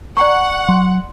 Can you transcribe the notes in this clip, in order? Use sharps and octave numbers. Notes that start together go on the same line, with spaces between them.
D5 F#5 G5 A#5 C#6
F#3 C6